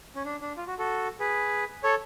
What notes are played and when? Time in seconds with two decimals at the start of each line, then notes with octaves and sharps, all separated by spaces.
0.15 C#4
0.25 D4
0.42 D4
0.57 F4
0.67 F#4
0.79 F#4 A4
1.20 G#4 B4
1.83 A4 C#5